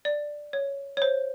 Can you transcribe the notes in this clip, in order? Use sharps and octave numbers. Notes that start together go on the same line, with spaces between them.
D5
C#5
C#5
C5